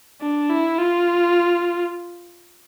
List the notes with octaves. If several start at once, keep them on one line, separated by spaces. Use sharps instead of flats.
D4
E4
F4